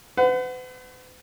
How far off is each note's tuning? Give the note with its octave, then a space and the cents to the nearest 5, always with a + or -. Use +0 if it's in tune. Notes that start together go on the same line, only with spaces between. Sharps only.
B4 +45 F#5 +0